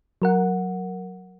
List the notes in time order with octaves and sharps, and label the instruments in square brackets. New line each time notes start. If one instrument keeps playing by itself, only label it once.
[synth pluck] F#3 A#4 F#5